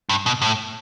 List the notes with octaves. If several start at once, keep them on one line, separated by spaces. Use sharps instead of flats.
G2
B2
A2